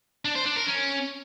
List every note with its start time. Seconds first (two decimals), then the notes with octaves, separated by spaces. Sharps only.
0.25 D4
0.35 C5
0.46 D4
0.56 A#4
0.66 C#4